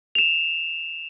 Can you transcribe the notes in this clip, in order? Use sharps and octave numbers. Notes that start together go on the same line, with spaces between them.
E7 F7